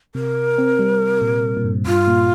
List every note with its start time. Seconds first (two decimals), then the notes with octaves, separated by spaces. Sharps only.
0.15 C3 A#4
0.58 C4
0.79 G3
1.21 A#2
1.57 A#2
1.64 G2
1.86 G2 F4
2.07 A#2